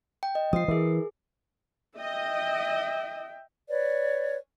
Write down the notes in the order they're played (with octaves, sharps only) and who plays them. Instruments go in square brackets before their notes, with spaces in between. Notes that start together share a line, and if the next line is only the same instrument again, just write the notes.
[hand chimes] G5
D#5
[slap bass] F3 [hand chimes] D#6 C7
[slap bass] E3 [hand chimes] G#4 A#4
[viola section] D#5 [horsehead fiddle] E5 G5
[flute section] B4 C#5 D5